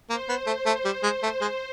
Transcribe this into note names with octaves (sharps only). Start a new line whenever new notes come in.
A#3 C5
B3
A3
A3
G3
G#3
A3
G#3